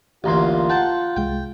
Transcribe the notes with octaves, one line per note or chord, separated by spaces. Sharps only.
A1 D2 A#3 F4 G4 A#5 C6
F#5 G5 A5
C2 G#3 G5